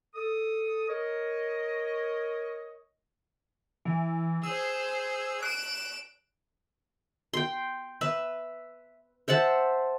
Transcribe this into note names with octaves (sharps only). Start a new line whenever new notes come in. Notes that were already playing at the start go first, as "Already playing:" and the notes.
A4 D#6
A#4 C#5 D#5
E3
G#4 C5 E6
F#6 D7 E7
G5 C6
B4 E5
C5 E5 F#5 A5